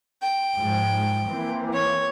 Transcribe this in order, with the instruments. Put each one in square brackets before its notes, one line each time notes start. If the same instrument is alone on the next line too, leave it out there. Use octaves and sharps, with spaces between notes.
[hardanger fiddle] G5
[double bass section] G#2 F3
E3 A#3 C4
[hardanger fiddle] C#5